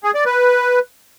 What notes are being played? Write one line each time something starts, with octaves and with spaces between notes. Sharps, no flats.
G#4
D5
B4